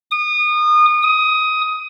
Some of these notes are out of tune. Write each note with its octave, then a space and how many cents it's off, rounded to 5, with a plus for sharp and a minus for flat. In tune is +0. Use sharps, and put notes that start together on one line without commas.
D#6 -30
D#6 +15